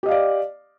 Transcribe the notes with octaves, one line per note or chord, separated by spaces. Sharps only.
G4 D5 D#5 F5